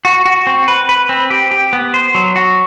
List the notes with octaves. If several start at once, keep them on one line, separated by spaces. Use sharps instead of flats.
F#4
F#4
C4
B4
B4
C4
G4
G4
B3
C5
F#3
F#4